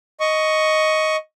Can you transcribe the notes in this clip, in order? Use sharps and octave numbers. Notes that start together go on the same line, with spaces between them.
D#5 C#6